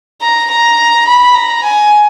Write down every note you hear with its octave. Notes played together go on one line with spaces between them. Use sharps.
A#5
A#5
B5
A#5
G#5